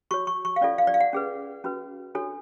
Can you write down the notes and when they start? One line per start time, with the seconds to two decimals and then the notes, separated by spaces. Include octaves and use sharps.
0.11 F#4 C#5 C#6
0.27 C#6
0.45 C#6
0.56 F5
0.61 C#4 F4 A4 D5
0.78 F5
0.87 D5
0.94 F5
1.01 F#5
1.13 C#4 G#4 B4
1.64 C#4 F#4 B4
2.15 D4 F#4 A4 C#5